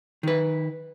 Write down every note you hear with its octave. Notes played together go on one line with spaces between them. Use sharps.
D#3 B4